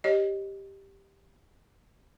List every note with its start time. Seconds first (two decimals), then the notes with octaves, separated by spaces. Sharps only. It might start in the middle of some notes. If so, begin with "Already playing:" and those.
0.04 G4 C#5 D#5